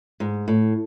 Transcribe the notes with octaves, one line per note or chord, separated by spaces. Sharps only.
G#2
A2